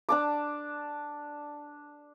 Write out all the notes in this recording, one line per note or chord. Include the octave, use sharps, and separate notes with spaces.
D4 A5 D6